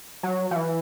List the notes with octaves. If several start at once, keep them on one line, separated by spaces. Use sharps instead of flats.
F#3
F3
E3